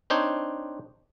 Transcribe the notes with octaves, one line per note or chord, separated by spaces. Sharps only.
C4 D4 D#4 C5 C#5